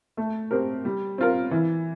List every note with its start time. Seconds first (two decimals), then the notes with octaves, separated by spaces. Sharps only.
0.17 A3
0.51 C4 G4 A#4
0.85 G3
1.18 C4 F4 A#4
1.51 E3